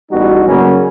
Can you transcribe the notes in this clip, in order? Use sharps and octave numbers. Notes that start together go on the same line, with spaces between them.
A1 G3 B3 D#4 F#4
C#3 F#3 A#3 C#4